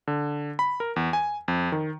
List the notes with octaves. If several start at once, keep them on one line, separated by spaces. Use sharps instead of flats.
D3
B5
A#4
E2
G#5
F2
D#3